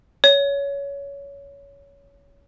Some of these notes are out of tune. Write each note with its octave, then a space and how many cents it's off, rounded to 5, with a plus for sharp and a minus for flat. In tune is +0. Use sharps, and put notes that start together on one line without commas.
C#5 +20